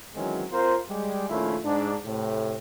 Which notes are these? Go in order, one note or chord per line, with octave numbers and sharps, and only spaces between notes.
D#3 E3 F#3 G#3 C4 C#4
C4 F4 A#4 C5
G3 G#3 G4
A#1 D#3 A3 C#4 E4 F4
G#2 D4
A2 C3